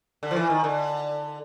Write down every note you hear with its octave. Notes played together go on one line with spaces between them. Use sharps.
D3
F3
E3
D#3
D3